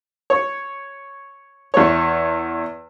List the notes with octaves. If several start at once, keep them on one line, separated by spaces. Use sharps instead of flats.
C#5
E2 C#5